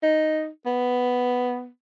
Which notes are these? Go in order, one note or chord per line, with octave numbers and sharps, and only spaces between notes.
D#4
B3